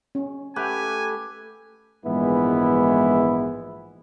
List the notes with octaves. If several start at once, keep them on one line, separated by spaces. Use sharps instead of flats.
C#4
A3 G4 B4 G#5
A#1 G#2 E3 G#3 B3 E4